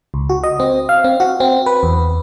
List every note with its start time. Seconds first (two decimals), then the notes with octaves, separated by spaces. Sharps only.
0.14 C#2
0.30 F#4
0.44 D#5
0.60 C4
0.89 F5
1.04 C4
1.20 F#4
1.40 C4
1.66 B4
1.83 E2